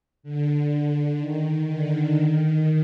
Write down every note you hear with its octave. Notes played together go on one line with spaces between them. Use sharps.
D3
D#3
D3
D#3